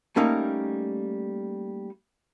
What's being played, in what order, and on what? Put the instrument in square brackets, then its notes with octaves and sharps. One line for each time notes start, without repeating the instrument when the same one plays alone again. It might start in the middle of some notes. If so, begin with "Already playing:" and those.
[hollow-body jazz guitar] G3 A3 A#3 C#4 D#4